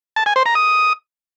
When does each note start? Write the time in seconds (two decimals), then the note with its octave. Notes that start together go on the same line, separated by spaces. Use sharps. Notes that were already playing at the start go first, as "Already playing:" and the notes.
0.16 A5
0.26 G#5
0.36 C5
0.46 A#5
0.55 D#6